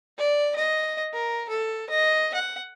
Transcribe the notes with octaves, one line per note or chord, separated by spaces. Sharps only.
D5
D#5
A#4
A4
D#5
F#5